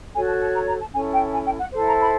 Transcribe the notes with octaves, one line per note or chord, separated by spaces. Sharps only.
F#4 A4 C#5 G#5
A5
A5
A#5
A#5
A5
C#4 E4 A4 G#5
G5
G#5
G5
F#5
E4 A4 C5
A#5
B5